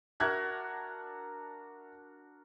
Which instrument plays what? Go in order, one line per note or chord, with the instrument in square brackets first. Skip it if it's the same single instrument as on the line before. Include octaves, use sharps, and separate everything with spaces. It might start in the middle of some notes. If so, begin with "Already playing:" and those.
[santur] D4 F#4 A#4 [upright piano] E5 F#6 G#6